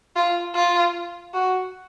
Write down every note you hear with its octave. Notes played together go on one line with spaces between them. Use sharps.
F4
F4
F#4